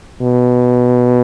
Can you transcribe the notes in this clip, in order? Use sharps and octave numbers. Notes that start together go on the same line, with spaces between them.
B2